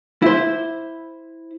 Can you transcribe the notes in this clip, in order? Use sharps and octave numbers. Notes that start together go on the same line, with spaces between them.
E4 C5